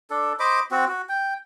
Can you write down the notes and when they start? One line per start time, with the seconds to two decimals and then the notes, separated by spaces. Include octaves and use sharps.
0.10 D4 A4
0.40 C5 D#5 B5 D6
0.71 C4 F#4
0.88 F#4
1.09 G5